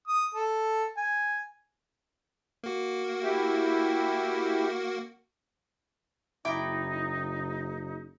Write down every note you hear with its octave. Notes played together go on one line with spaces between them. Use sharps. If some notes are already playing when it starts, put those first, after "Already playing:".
D#6
A4
G#5
A#3 F#4
E4 G4
F#1 D#4 E4 G5 D6